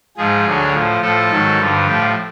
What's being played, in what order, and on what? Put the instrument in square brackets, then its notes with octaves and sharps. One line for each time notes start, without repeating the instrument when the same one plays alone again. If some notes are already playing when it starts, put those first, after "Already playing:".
[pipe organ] G#2 F3 G#4
D2 D3 F#3
A2 F3
A2 F3 A4
G#2 D#3 F#3
G2 D3 F3
A2 F3 G4